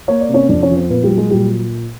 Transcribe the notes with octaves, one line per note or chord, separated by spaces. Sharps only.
A#3 C#5
D5
C3
C#4 C#5
F2 D4 D5
C#4 C#5
F3
C4 C5
A#2 B3 B4
G3 G4
F#3
G#3 G#4
A#2 G3 G4